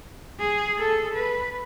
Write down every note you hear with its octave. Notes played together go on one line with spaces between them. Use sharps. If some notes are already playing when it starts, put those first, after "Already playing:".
G#4
A4
B4